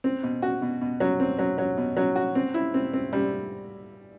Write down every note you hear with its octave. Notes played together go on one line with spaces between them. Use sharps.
C4
B2
F#4
B2
B2
F#3
C4
F#3
F#3
B2
F#3
F#4
C4
E4
C4
C4
G3